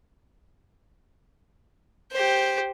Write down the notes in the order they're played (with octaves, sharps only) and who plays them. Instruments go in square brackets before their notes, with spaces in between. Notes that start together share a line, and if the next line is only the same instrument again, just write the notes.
[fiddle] G4 C5